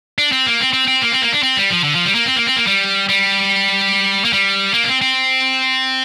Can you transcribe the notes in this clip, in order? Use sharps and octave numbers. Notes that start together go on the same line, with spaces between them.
D4
C4
A#3
C4
C4
C4
A#3
C4
A#3
D4
C4
G3
F3
D3
F3
G3
A#3
C4
A#3
C4
A#3
G3
G3
A#3
G3
A#3
D4
C4
C4